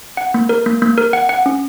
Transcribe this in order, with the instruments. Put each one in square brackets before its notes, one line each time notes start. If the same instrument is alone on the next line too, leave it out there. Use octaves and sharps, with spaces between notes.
[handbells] F#5
A#3
A#4
A#3
A#3
A#4
F#5
F#5
C#4